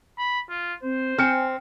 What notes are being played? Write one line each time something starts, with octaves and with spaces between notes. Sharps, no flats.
B5
F4
C4 C5
C4 G#5 F6 C#7